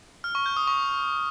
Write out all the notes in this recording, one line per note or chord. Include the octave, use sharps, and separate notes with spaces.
F6
C#6
G6
D#6
C#6